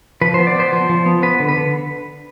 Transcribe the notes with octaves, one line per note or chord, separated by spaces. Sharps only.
F3 B4
B3 C5
D5
B3 C5
F3
F3
B3
B3 B4
D3
B4
D3